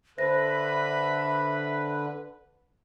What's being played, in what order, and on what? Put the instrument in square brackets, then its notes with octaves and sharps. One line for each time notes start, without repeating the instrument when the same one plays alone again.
[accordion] D3 B4 [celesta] C5 A#6 [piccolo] E5 [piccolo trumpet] B5